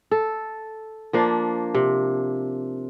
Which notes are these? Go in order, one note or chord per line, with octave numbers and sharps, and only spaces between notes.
A4
F3 A#3 D4
C3